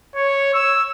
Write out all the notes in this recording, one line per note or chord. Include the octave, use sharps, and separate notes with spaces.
C#5
E6